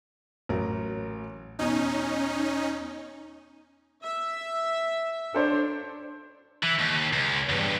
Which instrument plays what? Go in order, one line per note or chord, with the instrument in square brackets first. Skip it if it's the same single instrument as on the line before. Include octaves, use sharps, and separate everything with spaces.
[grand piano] A1 F#3 A#4
[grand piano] E2 B2 [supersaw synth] C#4 D#4
[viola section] E5
[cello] D4 [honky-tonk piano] A4 C5 C#5
[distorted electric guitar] E3
D#2
C#2
E2 G2